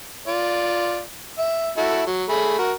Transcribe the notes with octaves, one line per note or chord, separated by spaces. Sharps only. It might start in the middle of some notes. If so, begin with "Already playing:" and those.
F4 D5
E5
E4 F#4 A4
F#3
A3 G#4 B5
F#4 A#4